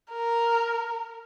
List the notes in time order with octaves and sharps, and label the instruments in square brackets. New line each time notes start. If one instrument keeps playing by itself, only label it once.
[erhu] A#4